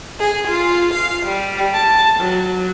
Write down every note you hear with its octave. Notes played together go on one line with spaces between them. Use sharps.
G#4
F4
F5
G3
A5
F#3